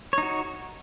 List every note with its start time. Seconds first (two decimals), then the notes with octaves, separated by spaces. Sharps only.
0.13 C#5
0.18 D#4
0.23 F#4